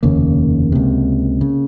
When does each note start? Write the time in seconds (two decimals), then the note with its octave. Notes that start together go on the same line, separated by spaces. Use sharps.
0.03 F1 D#2 C#3 A#3
0.72 C#2 C3
1.41 C#3